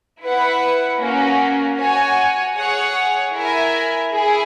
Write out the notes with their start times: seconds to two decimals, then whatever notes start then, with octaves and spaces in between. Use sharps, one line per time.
0.23 E4 B4 F#5
1.00 A#3 C#4 F#4
1.79 F#4 C#5 G#5
2.57 G#4 C#5 F#5
3.34 E4 A#4 E5 G#5
4.13 E4 G#4